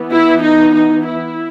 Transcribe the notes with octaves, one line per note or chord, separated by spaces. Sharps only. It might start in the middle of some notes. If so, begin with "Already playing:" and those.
Already playing: E3 B3
E4
D#4
D#4
E4